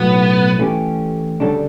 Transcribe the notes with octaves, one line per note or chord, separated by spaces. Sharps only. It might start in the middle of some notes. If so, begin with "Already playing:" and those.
Already playing: B1 A2 F#3 B3
E3 A3 C#4 G4
D2 C#3 G3 D4 A4